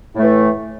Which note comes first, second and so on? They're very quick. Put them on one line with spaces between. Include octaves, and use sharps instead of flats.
A2 A3 E3